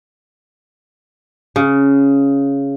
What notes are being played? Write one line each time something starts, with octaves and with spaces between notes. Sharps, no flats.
C#3